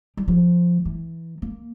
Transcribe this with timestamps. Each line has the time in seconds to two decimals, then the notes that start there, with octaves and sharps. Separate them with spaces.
0.17 G3
0.28 F3
0.85 E3
1.42 A#3